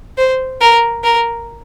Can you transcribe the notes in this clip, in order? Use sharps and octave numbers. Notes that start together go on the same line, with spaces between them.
C5
A#4
A#4